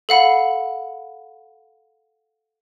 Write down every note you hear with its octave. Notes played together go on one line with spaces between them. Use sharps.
A4 F5 F#5 B5